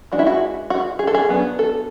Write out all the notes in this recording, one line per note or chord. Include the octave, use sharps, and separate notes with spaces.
E3 G#3 D4 F#4
E4
F#4
F#4
G#4
A4
G#4
F#3 B3 D4
A4